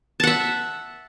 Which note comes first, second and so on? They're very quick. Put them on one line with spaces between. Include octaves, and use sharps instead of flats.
A5 F#5 E5